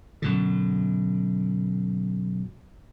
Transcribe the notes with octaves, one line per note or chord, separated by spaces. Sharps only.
F#2 B2 D3